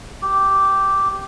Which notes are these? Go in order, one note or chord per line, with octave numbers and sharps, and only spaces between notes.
G4